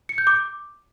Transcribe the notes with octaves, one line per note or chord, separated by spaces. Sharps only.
C#7
G6
D6